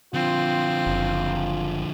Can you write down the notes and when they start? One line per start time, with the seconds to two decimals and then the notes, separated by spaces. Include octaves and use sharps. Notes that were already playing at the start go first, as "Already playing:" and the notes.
0.14 D3 F3 C4 F4
0.86 F#1